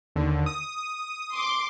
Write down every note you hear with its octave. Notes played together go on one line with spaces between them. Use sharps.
D#2 D3
D#6
C6 D6